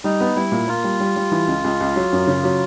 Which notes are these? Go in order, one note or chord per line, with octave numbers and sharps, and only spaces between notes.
G3 D#4
B3
G3 E4
A#2
A#3 F4
G3
G3
G3
E3
C#2
C#2
C#2
F#3
F#2
C#3
F#3